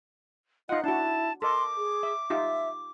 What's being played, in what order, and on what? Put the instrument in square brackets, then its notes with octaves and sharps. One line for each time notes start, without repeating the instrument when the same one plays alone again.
[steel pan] D#4 F#5 [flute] F4 [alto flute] D#5
[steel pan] D4 F#4 [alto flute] E4 [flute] A5
[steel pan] A4 A#4 D#5 [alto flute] C6 [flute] D6
[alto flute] G#4
[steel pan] E5
[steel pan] D#4 F4 G4 [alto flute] E5